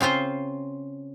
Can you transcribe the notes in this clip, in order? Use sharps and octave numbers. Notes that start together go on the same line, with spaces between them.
C#3 C4 F4 C5